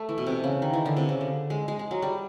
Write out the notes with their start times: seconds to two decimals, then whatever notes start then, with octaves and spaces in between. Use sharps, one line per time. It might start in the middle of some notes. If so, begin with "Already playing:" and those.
Already playing: A3
0.09 E3
0.18 B2
0.26 C3
0.44 C#3
0.62 D#3
0.73 E3
0.86 D3
0.97 C3
1.09 C#3
1.21 D3
1.50 G#3
1.68 G#3
1.79 G#3
1.91 F#3
2.02 G3